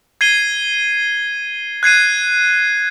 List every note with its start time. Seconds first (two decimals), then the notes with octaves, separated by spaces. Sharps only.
0.21 G#6 C7 D#7 G7
1.83 F#6 G#6 C7 D#7